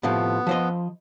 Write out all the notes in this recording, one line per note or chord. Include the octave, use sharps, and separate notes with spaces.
A2 C3 F3 B3
F3 C5 D#5